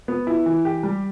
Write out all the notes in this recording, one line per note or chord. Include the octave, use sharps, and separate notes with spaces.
B3
E4
E3
G4
G3